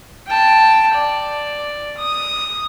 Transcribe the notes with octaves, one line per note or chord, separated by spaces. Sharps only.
G5 A5
D5
D#6